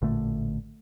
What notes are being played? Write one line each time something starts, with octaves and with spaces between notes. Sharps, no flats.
A1 A#2 D3 A3